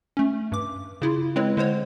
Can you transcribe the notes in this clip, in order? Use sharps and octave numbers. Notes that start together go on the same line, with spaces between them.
A3 C#4
G2 D6
C#3 E4 F4
G#3 C4 E4 B4 C#5
D3 G#3 C5 C#5